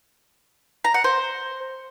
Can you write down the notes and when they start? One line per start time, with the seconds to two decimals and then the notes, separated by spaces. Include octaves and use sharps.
0.84 A#5
0.94 F#5
1.04 C5